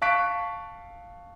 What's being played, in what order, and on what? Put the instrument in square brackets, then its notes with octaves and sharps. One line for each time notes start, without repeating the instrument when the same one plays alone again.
[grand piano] F5 A5 C#6 F#6 B6 D7